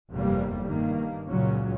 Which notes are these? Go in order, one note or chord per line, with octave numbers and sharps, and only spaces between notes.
F1 E2 G2 C3 G3 A#3
G2 D#3 A#3
C#2 A#2 C#3 F#3 C#4